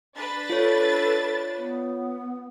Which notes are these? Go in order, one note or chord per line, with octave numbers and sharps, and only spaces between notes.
D4 B4 A6
F4 A4 C#5
B3